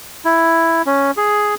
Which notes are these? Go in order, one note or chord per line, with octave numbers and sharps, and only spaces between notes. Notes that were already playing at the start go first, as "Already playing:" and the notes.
E4
C#4
G#4